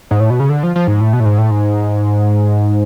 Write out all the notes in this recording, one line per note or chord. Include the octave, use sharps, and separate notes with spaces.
G#2
A2
B2
C#3
D3
F3
F3
G#2
A2
B2
A2
G#2
A2
G#2